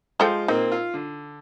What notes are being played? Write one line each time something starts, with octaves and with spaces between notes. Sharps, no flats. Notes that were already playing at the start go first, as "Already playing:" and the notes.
F3 G#3 F4 A4 C5 G5
A#2 A#3 C4 D#4
F4
D3